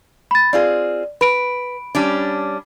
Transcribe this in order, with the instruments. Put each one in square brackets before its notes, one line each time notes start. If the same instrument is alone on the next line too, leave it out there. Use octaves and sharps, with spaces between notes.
[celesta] B5 A6
[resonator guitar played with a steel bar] C4 F4 G#4 [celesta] D5
[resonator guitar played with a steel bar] B4 [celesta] B5 D7
[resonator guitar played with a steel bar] G3 C#4 D4